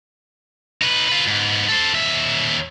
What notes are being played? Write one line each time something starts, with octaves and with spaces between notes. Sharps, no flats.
D#4 B4
F4 B4
G#2 B3
A4 C5
D#2 E5